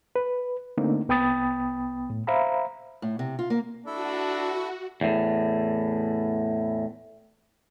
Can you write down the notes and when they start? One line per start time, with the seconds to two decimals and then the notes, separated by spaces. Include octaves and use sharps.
0.16 B4
0.77 D3 A3 A#3 C4 D4 D#4
1.09 C2 B3 G5 B5 D#6 A6
2.10 A2
2.27 C5 E5 F5 A#5 B5
3.02 A2
3.19 C3
3.39 F4
3.50 A#3
3.87 D4 E4 F#4 A4
5.01 E2 A2